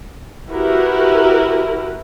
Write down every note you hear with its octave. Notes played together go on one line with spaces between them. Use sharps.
E4 F#4 G4 A#4 B4